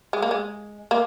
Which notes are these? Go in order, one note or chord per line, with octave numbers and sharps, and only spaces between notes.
G#3
A#3
G#3
A#3